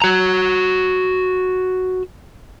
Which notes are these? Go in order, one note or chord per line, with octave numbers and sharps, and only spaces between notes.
F#4 A#5